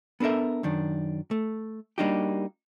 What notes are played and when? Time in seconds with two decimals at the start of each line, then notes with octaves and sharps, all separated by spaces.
0.20 B3 D4 A4 A#4 E5
0.63 F#2 D#3 D4
1.31 A3
1.98 G3 A#3 D4 D#4 F#4 G4